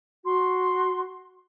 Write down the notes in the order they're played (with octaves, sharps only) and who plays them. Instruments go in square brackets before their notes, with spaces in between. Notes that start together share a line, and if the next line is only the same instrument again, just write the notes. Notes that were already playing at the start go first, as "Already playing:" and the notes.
[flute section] F#4 C6